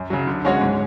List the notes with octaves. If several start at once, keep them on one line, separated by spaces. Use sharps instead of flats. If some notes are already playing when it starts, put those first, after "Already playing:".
Already playing: F#2
C#3 F#3
D3
G#3 C#4 F#4 C#5
G#2